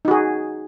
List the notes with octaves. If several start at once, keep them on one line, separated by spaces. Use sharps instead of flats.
D#4 F#4 G#4